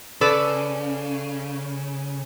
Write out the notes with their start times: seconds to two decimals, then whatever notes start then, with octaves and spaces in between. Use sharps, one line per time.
0.21 C#3 A4 B4 D5